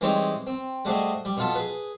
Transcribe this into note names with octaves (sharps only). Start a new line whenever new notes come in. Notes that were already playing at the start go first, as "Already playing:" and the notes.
E3 G3 G#3 C4 D#4 C#5
C4
G3 A3 F#4 G#4 C5 D#5
G3
B2 B3 F4 A4
G#4 B4